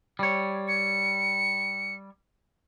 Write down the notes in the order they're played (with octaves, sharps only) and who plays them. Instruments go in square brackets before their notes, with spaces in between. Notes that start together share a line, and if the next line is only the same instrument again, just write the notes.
[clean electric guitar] G3 C#5
[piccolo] C#7